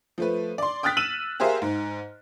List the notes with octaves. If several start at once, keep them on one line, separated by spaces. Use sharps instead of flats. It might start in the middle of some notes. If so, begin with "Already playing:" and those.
F3 A3 B4
D5 C6
G5 D#6 F6 F#6 A6 B6
E6 D#7 E7 F#7
G4 G#4 A#4 C5 E5 F5
G#2